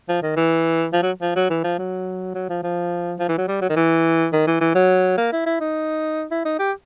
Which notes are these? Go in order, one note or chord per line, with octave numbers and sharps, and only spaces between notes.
F3
D#3
E3
F3
F#3
F3
F#3
E3
F3
F#3
F#3
F3
F3
F3
E3
F#3
G3
F#3
D#3
E3
D#3
E3
E3
F#3
A#3
E4
E4
D#4
E4
D#4
G4